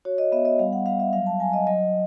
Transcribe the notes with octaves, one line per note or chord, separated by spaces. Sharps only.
F#4 C#5
D#5
B3 E5
D#5
G3 F5
F#5
G3 F5
E5
F#3 F5
A5
F#3 G#5
D#5
F#3 D#5